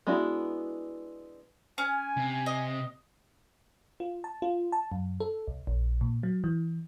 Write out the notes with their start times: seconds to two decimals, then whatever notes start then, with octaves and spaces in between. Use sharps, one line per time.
0.07 G#3 B3 D4 E4 F#4
1.78 C#4 G#5
2.17 C3
2.46 D#5
4.00 F4
4.24 A5
4.42 F4
4.72 A5
4.92 F#2
5.20 A4
5.47 C2
5.67 A#1
6.01 A#2
6.23 F#3
6.44 E3